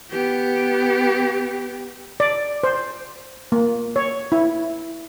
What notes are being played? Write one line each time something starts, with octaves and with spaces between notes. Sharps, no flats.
B3 G4
D5
C5
A#3
C#5
E4